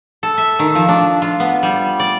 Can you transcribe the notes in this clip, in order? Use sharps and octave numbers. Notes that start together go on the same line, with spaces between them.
A4
E5
D#3
F3
D4
F4
B3
G3
D5